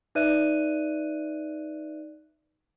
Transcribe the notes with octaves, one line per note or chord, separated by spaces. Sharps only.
D#4 B4 D5 E5 F#6 D#7